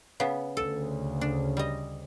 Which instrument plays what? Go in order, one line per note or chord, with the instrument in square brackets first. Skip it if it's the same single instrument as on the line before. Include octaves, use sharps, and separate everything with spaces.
[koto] C#3 B3
[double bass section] D2 C#3 [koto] A4
[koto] D4
G3 D#5